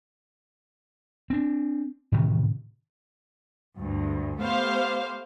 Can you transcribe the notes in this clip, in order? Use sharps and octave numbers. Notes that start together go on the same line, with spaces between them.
C4 D4
A2 C3 D#3 E3
D2 G2
A3 B3 G4 C5 F5